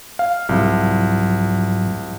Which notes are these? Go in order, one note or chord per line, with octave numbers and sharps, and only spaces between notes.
F5
C2 G#2 F3 F#3